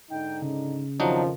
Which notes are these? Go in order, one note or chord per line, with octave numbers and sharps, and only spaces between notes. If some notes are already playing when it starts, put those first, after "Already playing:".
G#2 D3 D#4 G5
C#3
F2 D#3 F3 F#3 D4 D#4